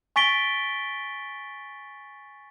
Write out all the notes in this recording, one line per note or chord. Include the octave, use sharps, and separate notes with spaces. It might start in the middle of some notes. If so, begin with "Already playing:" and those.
G#5 C#6 A6 B6 D7 G7